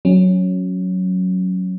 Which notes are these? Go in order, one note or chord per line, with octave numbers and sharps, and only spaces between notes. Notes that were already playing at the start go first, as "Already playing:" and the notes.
F#3 C#4